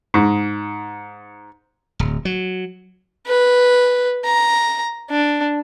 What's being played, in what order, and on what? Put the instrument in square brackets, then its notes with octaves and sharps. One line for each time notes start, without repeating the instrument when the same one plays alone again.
[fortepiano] G#2
[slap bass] D1
F#3
[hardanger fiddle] B4
A#5
D4